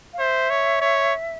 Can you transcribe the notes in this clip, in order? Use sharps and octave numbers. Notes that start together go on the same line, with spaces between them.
F5
C5 E5
C#5
C#5